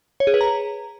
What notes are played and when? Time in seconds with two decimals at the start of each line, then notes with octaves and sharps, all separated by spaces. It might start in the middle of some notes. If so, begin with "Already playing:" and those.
0.20 C#5
0.27 G#4
0.34 B4
0.41 A#5